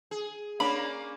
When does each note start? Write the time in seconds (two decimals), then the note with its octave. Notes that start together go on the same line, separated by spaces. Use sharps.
0.11 G#4
0.60 A#3 C#4 D4 B5